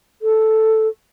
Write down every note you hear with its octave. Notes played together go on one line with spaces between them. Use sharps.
A4